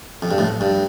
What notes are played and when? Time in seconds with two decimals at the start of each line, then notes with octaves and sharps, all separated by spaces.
0.22 F2
0.31 G2
0.38 F2 A2
0.61 G2